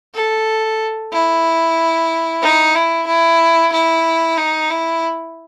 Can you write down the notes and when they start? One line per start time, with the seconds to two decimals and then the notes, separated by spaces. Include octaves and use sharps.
0.14 A4
1.12 E4
2.42 D#4
2.75 E4
3.07 E4
3.73 E4
4.37 D#4
4.70 E4